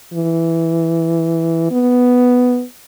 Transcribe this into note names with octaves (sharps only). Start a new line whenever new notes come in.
E3
B3